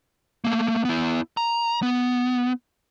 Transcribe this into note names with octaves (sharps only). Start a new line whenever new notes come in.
A3 A#3
B3 E4
A#5
B3